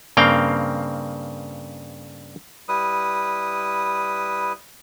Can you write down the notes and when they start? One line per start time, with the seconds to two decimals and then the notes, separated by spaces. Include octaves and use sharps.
0.17 G2 C#3 A#3 C4 F5 G5
2.69 G3 E4 B4 D#6